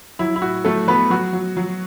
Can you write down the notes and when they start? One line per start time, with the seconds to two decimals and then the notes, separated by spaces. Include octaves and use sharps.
0.19 F#3 E4
0.36 E4
0.42 A2 F#4
0.65 F#3 A3 A4
0.87 F#3 B3 B4
1.10 F#3 F#4
1.33 F#3
1.57 F#3